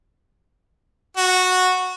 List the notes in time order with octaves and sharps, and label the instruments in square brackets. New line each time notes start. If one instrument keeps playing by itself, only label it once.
[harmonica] F#4